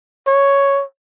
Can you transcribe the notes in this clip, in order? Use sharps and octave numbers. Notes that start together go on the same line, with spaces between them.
C#5